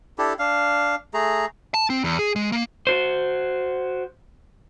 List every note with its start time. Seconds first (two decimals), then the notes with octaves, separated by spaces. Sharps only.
0.18 D4 E4 G4 A4
0.39 D4 F5
1.14 A3 G#4 A#5
1.74 A5
1.90 C4
2.04 E2
2.19 G#4
2.36 G#3
2.52 A#3
2.87 F#4 C5